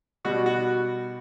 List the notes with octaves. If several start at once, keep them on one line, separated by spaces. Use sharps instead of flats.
B2 G3 F#4
F#4